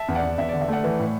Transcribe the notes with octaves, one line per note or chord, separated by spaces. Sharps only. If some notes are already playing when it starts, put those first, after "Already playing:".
Already playing: E5 A5
E2
D5 F#5
E2
E2 E5
D3 D5
E5
A3 D5 F#5
E3
A2